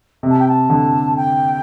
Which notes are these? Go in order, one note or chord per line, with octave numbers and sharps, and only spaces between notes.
C3
A5
G5
A5
D3
G5